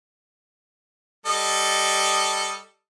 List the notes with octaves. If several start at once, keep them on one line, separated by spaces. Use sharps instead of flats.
G3 A4 D#5